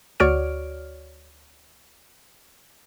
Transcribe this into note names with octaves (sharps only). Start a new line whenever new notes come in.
D2 F#4 C#5 D5 F6 D7